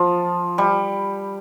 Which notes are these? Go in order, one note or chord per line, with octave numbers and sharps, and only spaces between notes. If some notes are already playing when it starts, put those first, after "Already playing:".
Already playing: F3
G3